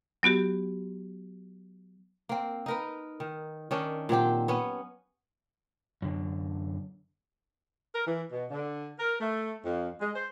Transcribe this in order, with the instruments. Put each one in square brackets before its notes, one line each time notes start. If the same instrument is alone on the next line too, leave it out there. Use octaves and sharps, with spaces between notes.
[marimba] F#3 B3 F#4 G4
[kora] A#3 C4
D#4 A#4 B4
D#3
D#3 C#4 D4
A#2 F#3 C4 G4
B3 C#4 B4
[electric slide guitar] F#2 D3
[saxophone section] A#4
E3
B2
D3
A#4
A3
F2
G#3
C5